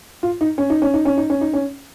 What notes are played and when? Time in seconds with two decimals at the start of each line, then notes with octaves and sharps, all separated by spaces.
0.23 F4
0.41 D#4
0.58 C#4
0.70 D#4
0.82 C#4
0.94 D#4
1.05 C#4
1.17 D#4
1.30 C#4
1.41 D#4
1.53 C#4